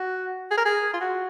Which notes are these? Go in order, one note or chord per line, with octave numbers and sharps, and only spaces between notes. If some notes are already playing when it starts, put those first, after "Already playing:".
Already playing: F#4
G#4
A#4
G#4
F4
F#4